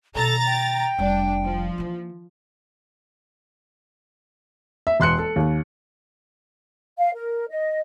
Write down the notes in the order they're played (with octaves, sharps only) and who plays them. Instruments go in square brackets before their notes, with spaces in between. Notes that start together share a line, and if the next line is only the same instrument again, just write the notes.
[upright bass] B2 D#3 [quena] A4 [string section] A#5 A6 A#6
[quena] G5
[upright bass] F1 G3 [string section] D4
[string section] F3
[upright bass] E3 A#3
[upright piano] E5
E1 C6 F#6 C#7
A4
D#2
[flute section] F5
A#4
D#5